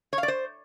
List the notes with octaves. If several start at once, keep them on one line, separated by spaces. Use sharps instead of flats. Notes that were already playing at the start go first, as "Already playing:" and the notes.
C#5
F5
D5
C5